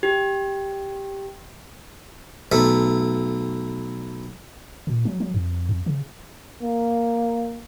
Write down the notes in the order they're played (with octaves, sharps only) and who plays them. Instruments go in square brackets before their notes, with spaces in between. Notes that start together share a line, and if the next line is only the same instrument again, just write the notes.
[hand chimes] G4
[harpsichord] B1 A3 E5
[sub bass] A#2
F#3
F#3
F2
F2
C#3
[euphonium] A#3